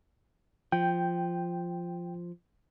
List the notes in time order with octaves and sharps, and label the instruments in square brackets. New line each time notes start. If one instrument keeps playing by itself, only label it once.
[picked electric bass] F3 [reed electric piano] G5